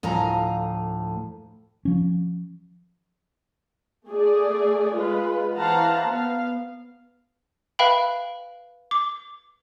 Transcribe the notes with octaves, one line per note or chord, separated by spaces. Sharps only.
D2 A2 F3 F5 G#5 A#5
F3 C#4
A3 G#4 D5
G#3 F4 B4
E3 C5 F5 F#5 A5 A#5
B3 F5
B4 E5 F5 G5 B5
D6